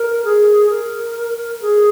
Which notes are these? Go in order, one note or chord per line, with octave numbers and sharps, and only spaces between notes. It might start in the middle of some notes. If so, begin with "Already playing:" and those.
Already playing: A#4
G#4
A#4
G#4